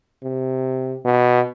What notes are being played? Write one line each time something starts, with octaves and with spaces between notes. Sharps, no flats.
C3
B2